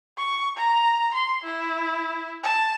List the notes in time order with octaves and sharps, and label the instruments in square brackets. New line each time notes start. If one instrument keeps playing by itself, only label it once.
[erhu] C#6
A#5
C6
E4
A5